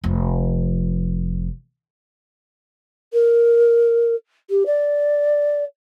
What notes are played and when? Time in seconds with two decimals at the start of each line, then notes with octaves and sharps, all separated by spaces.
0.04 F1 F3
3.13 A#4
4.50 G4
4.66 D5